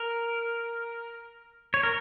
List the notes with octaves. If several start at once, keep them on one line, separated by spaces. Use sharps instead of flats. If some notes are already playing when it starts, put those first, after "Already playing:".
Already playing: A#4
C#5
A#4